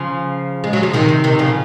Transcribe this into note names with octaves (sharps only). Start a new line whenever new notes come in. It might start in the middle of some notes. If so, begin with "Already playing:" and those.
Already playing: C#3 F3
G#3
F#3
F3
C3 D#3
C3
C3 D#3
C#3 F3